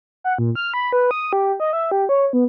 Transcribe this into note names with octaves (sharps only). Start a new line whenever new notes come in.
F#5
A#2
F6
B5
B4
D#6
G4
D#5
E5
G4
C#5
B3